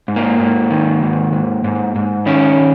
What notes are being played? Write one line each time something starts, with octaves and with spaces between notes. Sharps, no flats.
G#2
A#3
G#2
D#3
G#2
G#2
G#2
G#2
D#3 C#4